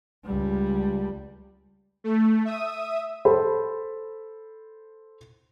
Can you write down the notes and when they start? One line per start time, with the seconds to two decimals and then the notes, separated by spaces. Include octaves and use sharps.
0.24 C#2 G3
2.04 A3
2.45 E5 D#6 D#7
3.25 A4 C5 B5